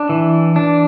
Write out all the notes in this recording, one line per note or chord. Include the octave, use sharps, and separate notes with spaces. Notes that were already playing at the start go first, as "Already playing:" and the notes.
Already playing: D4
E3
D4